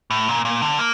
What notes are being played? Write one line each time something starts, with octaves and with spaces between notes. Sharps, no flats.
A2
A#2
A#2
D3
A#3